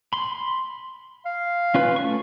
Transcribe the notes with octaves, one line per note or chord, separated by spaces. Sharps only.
B5 C6
F5
C#4 F4 B4
A3 C#6